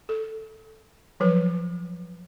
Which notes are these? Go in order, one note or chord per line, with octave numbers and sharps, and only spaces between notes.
A4
F3 F#3 B4